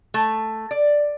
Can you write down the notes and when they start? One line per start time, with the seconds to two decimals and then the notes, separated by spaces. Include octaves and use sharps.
0.14 A3
0.71 D5